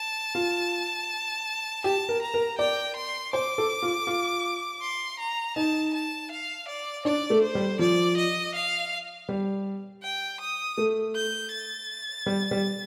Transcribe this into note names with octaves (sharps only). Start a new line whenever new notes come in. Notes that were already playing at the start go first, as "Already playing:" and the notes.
Already playing: A5
F4
G4 A5
A#4
A#5
A#4
D5 G5
C6
C5 D6
A4
F4
F4
C6
A#5
D#4 A5
A5
F5
D5
D4 D5
A3
C5
G3
F3 D5
D#5
F5
G3
G5
D#6
A3
G6
A6
G3
G3